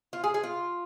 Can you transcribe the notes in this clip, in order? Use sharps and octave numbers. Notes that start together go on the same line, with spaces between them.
F4
G#4
G#4
F4